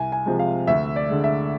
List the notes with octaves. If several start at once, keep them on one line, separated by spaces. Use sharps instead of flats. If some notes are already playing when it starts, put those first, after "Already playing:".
Already playing: C2 G#5
G#5
C3 F3 G#3
F5
D2 E5
D5
D3 G#3
E5